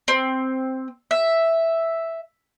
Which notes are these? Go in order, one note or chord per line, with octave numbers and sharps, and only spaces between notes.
C4
E5